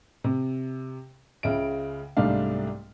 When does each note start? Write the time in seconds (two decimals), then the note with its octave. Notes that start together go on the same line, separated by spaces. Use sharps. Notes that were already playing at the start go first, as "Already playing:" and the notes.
0.24 C3
1.43 C#2 C#3 E5 D7
2.17 C2 G#2 G3 A3 D4 F5